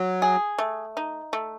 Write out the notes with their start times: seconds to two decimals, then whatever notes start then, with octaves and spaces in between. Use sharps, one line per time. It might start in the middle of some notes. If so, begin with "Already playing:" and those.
Already playing: F#3
0.22 G#4
0.58 A3
0.97 D#4
1.33 A3